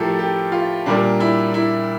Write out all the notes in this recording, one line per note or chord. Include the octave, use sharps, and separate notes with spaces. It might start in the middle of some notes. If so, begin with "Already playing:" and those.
Already playing: A2 F3 A3 G4 A4 A#4
G4
F4
A#2 G3 A#3 D4
E4
E4